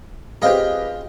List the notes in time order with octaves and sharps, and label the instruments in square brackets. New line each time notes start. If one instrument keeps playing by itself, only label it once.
[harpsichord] C4 F4 G#4 [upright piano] G4 B4 D#5